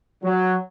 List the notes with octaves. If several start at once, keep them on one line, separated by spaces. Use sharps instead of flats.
F#3